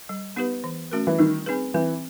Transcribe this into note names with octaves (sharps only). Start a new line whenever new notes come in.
G3
B3 D#4 G4 B4
E3
A3 C#4 F#4 A#4
E3
D#3 G3
C4 D#4 G#4 B4
E3 C4